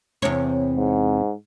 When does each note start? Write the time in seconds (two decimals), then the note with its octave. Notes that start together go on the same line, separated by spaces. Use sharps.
0.22 E2 C3 C#5
0.76 G#2